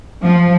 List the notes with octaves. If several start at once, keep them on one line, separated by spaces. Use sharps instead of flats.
F3